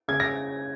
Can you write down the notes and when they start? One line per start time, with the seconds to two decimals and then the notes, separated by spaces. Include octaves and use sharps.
0.08 C#3 G#6
0.20 A#6